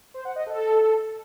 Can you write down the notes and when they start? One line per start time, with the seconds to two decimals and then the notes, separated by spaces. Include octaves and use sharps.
0.14 C5
0.25 F#5
0.36 D#5
0.47 A4